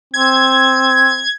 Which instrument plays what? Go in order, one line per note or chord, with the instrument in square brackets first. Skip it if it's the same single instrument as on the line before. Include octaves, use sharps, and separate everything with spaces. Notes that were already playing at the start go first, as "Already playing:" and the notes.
[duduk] C4 [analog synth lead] G#6